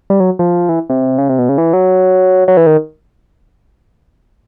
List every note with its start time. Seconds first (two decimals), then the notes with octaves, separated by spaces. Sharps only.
0.10 G3
0.20 F#3
0.39 F3
0.69 E3
0.90 C3
1.18 C#3
1.29 C3
1.39 B2
1.49 C#3
1.58 E3
1.73 F#3
2.48 F#3
2.57 E3
2.67 D#3